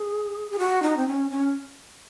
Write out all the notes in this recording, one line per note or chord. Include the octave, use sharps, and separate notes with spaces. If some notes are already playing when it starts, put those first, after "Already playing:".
Already playing: G#4
G#4
F#4
D#4
C4
C#4
C#4